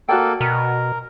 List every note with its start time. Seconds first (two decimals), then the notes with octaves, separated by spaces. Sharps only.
0.09 A#3 F#4 A4 D5 G5
0.41 B2 A#4